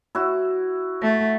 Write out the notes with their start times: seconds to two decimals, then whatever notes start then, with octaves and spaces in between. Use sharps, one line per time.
0.15 E4 F#4
1.03 A3